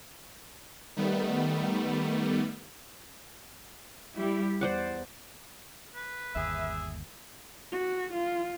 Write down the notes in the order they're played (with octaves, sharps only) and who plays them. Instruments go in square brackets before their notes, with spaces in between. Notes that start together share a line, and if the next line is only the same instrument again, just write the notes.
[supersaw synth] D#3 G3 A3 B3
[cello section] G3 E4 G4
[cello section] E2 [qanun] C5 D5 F#5
[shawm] B4
[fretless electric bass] G1 D#2 [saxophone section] G#4 E5
[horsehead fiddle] F#4
F4